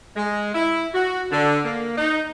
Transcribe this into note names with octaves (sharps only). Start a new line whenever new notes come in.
G#3
E4
F#4
D3
A#3
D#4